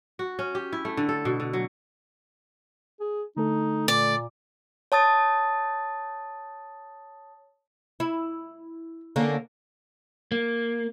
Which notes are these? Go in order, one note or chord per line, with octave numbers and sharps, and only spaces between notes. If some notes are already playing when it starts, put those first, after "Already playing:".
F#4
C#4
G4
E4
A3
D3
A4
B2
D3
F#3
G#4
D3 A3 D#4 A4
A#2 D5
C#5 A5 D#6 A6
E4
D3 A#3 C#4
A#3